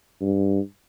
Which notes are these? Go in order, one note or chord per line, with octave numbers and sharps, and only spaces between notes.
G2